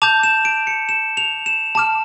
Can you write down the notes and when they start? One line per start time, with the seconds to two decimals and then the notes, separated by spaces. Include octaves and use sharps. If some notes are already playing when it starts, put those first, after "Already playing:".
0.02 A5 D6 G6 F7
0.23 E7
0.45 D7
0.67 C#7
0.89 E7
1.17 F7
1.46 E7
1.75 A5 D6 F6 E7